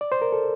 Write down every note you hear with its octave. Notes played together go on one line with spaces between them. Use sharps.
D5
C5
A#4
A4